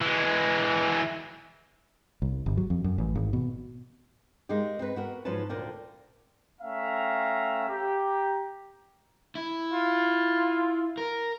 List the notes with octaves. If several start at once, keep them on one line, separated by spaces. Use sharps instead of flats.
E3 G#3
C2
G1
F#3
F2
F#2
A1
G#1
B2
G#3 A#3 D#4 G4
C4 D#4 B4
B3 F#4 A#4
G#2 F3 F#3 C#4 B4 A5
D2 A#2 A#4 D5 G5
A3 C#4 E5 F5 G5 A#5
G4 A#5
E4
F4
A#4